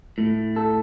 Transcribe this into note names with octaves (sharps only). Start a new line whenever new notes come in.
A2
A4